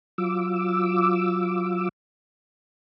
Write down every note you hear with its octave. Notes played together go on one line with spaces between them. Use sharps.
F#3 F4 D6 E6